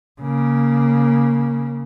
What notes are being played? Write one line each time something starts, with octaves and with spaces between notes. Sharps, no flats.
C#3 A#3